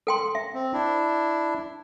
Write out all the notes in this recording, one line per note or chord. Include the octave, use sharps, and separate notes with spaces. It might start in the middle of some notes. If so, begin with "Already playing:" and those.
A4 G5 C6
E5
C4
D4 E4